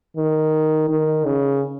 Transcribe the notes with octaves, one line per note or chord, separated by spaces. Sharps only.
D#3
D#3
C#3